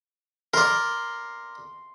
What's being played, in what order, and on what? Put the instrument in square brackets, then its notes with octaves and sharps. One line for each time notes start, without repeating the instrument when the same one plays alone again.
[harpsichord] A#4 D5 [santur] C6